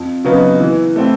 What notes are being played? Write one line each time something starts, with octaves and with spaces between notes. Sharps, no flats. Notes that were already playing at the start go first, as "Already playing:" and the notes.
Already playing: F2
C#3 F#3 B3 D#4
E3
A3 C4 E4